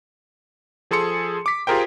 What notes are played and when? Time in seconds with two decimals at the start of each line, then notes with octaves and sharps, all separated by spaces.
0.91 F3 G#4 A4 C6 C#7
1.46 D6 B6
1.67 F4 G4 G#4 A#4 C5 G5